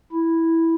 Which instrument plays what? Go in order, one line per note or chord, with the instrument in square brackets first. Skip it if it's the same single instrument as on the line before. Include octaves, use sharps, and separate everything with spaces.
[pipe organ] E4